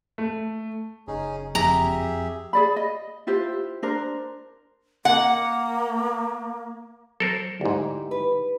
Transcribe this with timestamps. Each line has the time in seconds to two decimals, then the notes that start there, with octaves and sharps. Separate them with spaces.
0.18 A3
1.08 F#1 C#4 D#4 G#4
1.55 F2 G4 G#4 E5 A#5
2.53 G#4 D5 B5
2.76 D#5
3.27 E4 F4 G4 C5
3.82 D4 A#4 C5
5.05 A#3 F#5
7.20 F#3 A4 A#4 C5
7.61 D2 G#2 D#4 E4 G4
8.11 B4